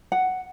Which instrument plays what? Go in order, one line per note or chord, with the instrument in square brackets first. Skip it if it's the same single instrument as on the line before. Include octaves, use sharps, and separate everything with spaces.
[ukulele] F#5